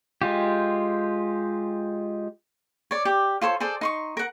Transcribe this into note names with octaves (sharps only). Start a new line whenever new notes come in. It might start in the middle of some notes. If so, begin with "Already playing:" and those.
G#3 F4 G4
C#5 D5
G4
F4 A4 C5 C#5
G#4 A4 C5 D5
D#4 C6 C#6
A#4 F#5